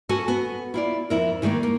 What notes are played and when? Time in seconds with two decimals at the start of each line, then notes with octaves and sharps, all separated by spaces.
0.09 C#4 F#4 A4 G#5 A5
0.28 B3
0.74 E4 F4 D5
1.10 F2 E4 A#4
1.42 D3 D#3 G3 A3 A#3
1.63 A#3